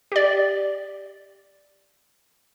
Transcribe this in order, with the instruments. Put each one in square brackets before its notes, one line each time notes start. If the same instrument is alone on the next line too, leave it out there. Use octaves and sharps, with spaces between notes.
[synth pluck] G4 D5